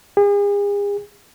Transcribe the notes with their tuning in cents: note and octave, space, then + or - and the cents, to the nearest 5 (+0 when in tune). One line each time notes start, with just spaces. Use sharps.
G#4 -40